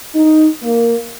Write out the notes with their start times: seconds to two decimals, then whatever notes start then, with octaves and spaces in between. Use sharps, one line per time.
0.14 D#4
0.62 A#3